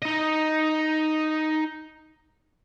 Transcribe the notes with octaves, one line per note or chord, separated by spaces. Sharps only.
D#4 D#5